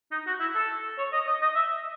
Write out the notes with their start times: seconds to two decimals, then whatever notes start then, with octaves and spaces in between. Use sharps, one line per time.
0.11 D#4
0.27 F#4
0.40 E4
0.55 A4
0.98 C#5
1.13 D#5
1.27 D#5
1.42 D#5
1.55 E5